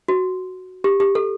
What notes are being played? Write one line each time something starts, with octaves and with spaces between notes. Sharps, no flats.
F#4
G4
G4
A4